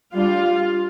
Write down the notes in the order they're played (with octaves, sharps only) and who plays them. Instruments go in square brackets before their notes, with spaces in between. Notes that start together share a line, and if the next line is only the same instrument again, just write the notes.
[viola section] G3 D4 F4 F5